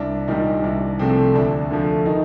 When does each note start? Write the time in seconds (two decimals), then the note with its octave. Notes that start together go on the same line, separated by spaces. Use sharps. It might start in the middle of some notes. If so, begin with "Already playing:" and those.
Already playing: C2 D4
0.28 A#2 D#3 G3 D#4
0.63 C2 D4
0.99 C3 F3 A3 C4
1.35 D2 D4
1.71 D3 F3 A3
2.06 D#3 D#4